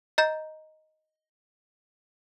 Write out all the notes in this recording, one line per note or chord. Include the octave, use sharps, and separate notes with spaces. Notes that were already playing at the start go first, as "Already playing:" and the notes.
D#5 A#5 G6